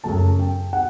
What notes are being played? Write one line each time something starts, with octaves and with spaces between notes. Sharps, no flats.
F#2 C#3 F#3 A3 A5
G5
F#5